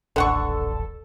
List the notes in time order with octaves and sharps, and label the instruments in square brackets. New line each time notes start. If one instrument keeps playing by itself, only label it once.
[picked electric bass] D#1 A1 [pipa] D3 F#5 C#6 [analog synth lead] A4